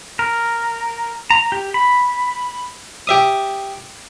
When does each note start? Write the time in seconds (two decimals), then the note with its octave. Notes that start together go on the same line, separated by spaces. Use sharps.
0.19 A#4
1.30 A#5
1.52 G4
1.74 B5
3.07 G4 E5 D#6